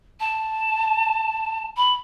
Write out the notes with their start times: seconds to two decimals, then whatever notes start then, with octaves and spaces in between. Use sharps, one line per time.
0.20 A5
1.76 B5